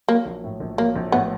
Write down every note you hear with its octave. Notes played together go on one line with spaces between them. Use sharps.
F#3 A#3
A#1
A2
A#1
F#3 A#3
A#1
A2 B3